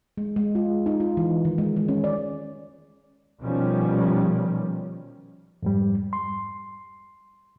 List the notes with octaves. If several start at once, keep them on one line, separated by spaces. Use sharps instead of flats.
G#3
G#3
F4
D#4
F4
E3
D#3
G#3
G#3
C#4
D5
B2 D#3 F3 G3 C#4
F2 G#2 G3
C6